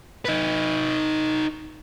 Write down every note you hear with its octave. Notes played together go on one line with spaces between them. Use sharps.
D#4 B4